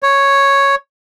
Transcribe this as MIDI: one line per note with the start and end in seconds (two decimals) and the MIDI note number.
0.03 0.75 73